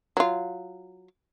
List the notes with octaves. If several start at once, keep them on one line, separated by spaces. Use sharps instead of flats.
F#3 F4